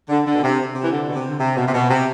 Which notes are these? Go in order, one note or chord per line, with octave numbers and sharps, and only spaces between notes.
D3
D3
B2
C3
C3
E3
D3
B2
C3
D3
C3
B2
C3
B2
C3